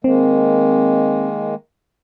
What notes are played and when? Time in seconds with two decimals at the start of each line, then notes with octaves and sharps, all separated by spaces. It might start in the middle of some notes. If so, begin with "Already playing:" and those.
0.04 D#3 G#3 A#3 C4